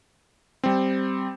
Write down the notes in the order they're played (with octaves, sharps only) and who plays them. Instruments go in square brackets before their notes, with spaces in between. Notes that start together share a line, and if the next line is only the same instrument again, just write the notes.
[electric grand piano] G3 C4